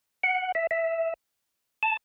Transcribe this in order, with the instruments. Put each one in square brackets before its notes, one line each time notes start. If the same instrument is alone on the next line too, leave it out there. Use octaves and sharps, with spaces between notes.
[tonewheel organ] F#5
E5
E5
A5